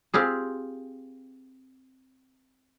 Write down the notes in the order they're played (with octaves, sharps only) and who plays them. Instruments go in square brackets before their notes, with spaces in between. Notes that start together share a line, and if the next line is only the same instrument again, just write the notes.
[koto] C4 F4 G4 G#4